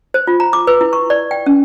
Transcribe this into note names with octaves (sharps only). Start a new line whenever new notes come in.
C5
F4
A#5
D6
B4
E4
C#6
D5
G5
C#4